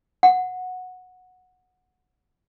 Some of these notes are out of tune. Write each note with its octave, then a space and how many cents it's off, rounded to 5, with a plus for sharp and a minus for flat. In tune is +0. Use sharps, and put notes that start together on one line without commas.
F#5 -10